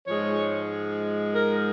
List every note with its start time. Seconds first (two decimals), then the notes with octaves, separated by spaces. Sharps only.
0.06 G#2 F3 G#3 C#5
1.33 A#4